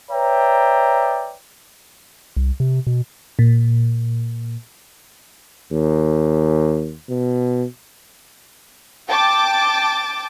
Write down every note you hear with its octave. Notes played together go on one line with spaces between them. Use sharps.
B4 C#5 D5 E5 G5 A#5
C2
C3
B2
A#2
D#2
B2
G5 A5 D6 A6